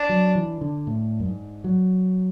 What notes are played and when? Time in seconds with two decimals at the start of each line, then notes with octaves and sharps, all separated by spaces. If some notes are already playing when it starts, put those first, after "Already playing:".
Already playing: D4
0.09 F#3
0.35 E3
0.61 D3
0.87 A2
1.20 F#2
1.26 G#2
1.64 F#3